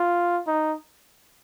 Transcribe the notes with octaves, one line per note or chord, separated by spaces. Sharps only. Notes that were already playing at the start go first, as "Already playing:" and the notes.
Already playing: F4
D#4